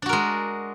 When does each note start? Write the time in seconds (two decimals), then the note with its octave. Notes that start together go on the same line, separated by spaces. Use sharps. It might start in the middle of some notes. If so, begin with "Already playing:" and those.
0.02 D4
0.06 F#4
0.09 A#4
0.13 G#3